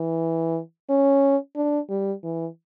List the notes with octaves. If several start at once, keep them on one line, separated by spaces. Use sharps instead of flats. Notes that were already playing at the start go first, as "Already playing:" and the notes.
Already playing: E3
C#4
D4
G3
E3